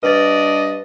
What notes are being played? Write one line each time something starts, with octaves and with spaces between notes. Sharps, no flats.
G2 B4 D5 D#5 A6